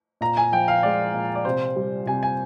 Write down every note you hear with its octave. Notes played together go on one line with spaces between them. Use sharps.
A#2 A#5
G#5
F3 G5
F5
G#3 D5
A#2
D5
C3 C5
G3
C3 G#5
G#5